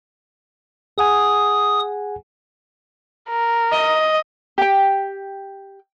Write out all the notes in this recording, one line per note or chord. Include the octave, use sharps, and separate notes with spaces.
G#4 F#5 G#5 D#6
A#4
D#5
G4 G5